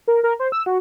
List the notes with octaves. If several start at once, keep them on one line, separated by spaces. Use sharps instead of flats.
A#4
A#4
C5
E6
F#4